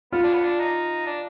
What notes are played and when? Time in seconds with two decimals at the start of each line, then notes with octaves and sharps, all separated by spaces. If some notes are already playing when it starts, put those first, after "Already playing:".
0.13 B3 F4
0.23 D4
0.34 B3
0.44 D4
0.60 D#4
1.06 D4